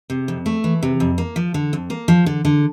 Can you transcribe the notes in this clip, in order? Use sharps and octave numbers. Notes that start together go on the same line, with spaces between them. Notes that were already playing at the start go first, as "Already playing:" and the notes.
C3
F2
A3
E3
C3
F2
A#3
F3
D3
F2
A#3
F3
D3
D3